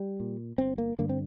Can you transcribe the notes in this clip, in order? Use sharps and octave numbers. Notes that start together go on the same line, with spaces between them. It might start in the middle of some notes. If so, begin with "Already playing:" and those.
Already playing: G3
A#2
G1 C4
A#3
G2 D3 A#3
C4